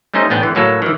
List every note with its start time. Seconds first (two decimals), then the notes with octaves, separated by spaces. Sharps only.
0.14 G3 A3 C#4 D#4 C5 D#5
0.30 A1 B3 D4 G5
0.43 D3 E3
0.55 A2 F#3 A#3 A4
0.82 D#3 E3